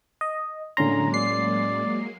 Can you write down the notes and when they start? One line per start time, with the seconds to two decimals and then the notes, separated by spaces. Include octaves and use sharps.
0.21 D#5
0.77 A2 D3 F#3 G#3 A#3 C#4 A#5 C6
1.14 D5 C7